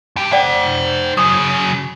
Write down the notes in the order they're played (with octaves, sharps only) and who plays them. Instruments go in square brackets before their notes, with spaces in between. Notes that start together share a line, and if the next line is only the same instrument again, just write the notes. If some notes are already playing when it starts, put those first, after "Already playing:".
[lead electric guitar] G2 G4
[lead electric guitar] C5 F#5 [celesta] D5 G5
[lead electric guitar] C#3 F#3 [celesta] D#6